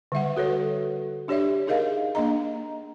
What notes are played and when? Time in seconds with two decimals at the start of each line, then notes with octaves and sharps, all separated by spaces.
0.12 D3 G3 E5 F#5
0.37 F#4 A4 B4 C#5
1.28 D4 G4 C#5 D5 E5
1.67 D#4 G#4 A#4 D#5 F5
2.15 A#3 D4 D#5 A#5